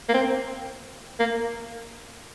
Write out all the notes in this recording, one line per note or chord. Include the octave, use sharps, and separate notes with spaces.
A#3
C4
A#3